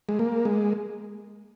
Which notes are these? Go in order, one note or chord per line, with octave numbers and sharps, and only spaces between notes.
G#3
A#3
G#3